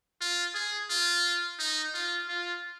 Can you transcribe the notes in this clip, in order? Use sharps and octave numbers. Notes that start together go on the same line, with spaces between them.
F4
G#4
F4
D#4
F4
F4